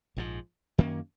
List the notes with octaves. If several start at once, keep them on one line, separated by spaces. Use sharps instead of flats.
A#1 G#2 F3
F#2 D#3 A#3 C#4